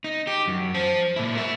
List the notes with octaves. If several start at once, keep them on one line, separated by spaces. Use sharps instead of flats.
D#4
G4
F#2
C5 A5
A#2 E4
A#4 E5